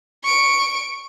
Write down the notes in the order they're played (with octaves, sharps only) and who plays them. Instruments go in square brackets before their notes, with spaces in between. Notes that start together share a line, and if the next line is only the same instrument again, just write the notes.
[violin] C#6 D7